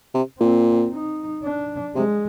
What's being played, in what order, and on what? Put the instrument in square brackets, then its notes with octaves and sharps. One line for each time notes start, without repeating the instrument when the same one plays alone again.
[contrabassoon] C3
[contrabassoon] A#2 [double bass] C4
[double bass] D#4
D4
[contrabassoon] C3 [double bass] G#3